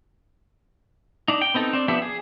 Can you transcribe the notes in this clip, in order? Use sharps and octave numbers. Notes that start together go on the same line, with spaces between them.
D4 D#4
G5
B3 C4 D#4 A4
C4 D4
F3 B3 D4 G4 E5
G#4